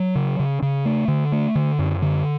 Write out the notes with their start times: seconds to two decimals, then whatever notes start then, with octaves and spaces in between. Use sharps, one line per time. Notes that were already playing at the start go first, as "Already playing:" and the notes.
Already playing: F#3
0.15 C#3
0.40 C#3
0.62 C#3
0.85 A3
1.08 D3
1.32 A3
1.55 D3
1.79 F#2
2.02 D3